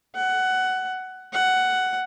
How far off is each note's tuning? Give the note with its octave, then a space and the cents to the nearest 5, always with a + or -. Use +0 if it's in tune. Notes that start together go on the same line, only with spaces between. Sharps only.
F#5 +15
F#5 +10